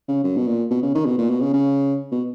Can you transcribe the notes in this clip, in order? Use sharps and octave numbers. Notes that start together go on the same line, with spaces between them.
C#3
F#2
B2
A#2
B2
C#3
D#3
B2
A#2
B2
C#3
C#3
B2